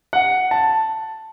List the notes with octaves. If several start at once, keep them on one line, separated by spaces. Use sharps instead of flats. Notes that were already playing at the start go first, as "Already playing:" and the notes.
F#5
A5